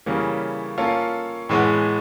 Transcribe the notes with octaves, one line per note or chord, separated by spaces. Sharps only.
C#3 E3 G3 A#3 C#4
A#3 C#4 F4 A4
A2 E3 G#3 B3